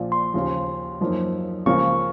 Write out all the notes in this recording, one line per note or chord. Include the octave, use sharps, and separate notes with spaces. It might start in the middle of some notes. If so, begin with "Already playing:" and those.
Already playing: A#1 A#2 F3
C6
D#2 C#3 F3
F#2 F3 A#3 D#4
C#2 C#3 F3 A#3 C#6